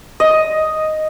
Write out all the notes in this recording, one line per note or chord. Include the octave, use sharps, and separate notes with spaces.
D#5